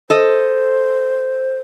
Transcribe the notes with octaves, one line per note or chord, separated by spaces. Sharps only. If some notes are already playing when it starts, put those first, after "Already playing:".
A4 C5 D#5